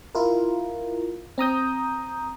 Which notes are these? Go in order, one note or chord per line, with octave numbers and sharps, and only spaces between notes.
E4 F4 A#4
C4 A#5 D#6 G6